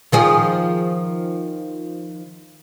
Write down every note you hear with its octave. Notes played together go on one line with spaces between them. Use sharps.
D#3 F3 G#4